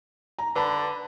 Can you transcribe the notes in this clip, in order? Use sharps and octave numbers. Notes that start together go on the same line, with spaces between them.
A#5
D3 B4 A5 B5